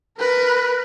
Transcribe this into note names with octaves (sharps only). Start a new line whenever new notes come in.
A#4 B4